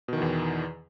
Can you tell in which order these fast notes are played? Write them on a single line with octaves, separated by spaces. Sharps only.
B2 D#3 E3 E2